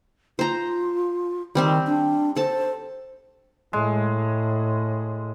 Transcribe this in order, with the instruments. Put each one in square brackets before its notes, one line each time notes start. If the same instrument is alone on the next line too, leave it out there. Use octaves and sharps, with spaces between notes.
[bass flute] F4 [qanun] C5 A#5
[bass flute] D#3 [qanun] G3 C4 G4
[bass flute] D4
[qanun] A4 A5 [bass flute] C5
[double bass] A2 [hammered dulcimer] G#3